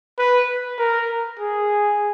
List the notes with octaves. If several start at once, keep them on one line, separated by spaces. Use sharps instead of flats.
B4
A#4
G#4